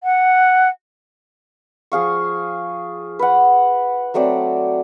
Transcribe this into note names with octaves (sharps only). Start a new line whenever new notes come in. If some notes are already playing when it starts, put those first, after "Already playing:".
F#5
F3 G#4 F5 C#6
B4 F#5
F#3 A3 C4 D5